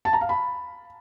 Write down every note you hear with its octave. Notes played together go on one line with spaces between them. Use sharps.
A5
A#5
F5
B5